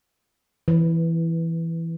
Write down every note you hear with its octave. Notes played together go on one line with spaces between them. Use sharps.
E3